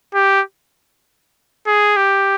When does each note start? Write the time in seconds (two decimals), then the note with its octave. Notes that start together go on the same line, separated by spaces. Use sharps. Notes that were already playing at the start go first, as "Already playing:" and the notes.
0.14 G4
1.67 G#4
1.97 G4